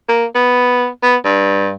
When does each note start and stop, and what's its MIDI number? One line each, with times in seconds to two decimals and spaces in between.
0.09 0.25 58
0.35 0.87 59
1.03 1.16 59
1.25 1.73 43